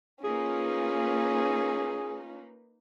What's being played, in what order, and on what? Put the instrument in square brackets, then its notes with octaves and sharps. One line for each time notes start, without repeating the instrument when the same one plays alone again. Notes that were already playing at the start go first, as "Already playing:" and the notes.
[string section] A#3 D#4 B4 [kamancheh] C#4 F4 [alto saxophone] G#4